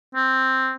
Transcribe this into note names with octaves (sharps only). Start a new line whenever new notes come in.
C4